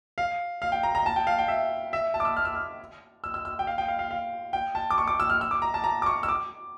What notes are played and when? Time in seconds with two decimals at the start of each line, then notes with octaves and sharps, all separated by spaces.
0.18 F5
0.62 F5
0.72 G5
0.83 A#5
0.95 A#5
1.06 A5
1.16 G5
1.27 F5
1.39 G5
1.48 E5
1.93 E5
2.14 A5
2.20 D6
2.25 E6
2.37 F6
2.45 E6
2.55 F6
3.24 E6
3.34 E6
3.45 E6
3.59 G5
3.67 F5
3.78 G5
3.88 F5
3.99 F5
4.11 F5
4.53 G5
4.75 A5
4.91 D6
4.98 C#6
5.08 D6
5.20 E6
5.30 F6
5.41 E6
5.51 D6
5.62 A#5
5.74 A5
5.84 A#5
6.02 D6
6.06 C#6
6.23 E6
6.28 D6